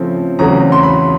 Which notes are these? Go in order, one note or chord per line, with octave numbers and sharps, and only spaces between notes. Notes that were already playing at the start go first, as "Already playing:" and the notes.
Already playing: C#3 F3 A3 C4
E2 C#3 F#3 A3 C4 A#5
C6
B5